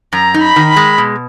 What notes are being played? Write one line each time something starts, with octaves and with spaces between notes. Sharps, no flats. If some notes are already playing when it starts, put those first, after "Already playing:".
F#2 A#5
D#4
B5
D#3
B5
G#3
B2